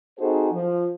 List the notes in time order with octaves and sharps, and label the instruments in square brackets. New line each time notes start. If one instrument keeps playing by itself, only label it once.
[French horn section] C4 D#4 F#4 G#4 A4 C5
F3